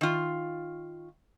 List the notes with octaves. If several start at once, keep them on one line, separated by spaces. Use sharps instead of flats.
D#3 F4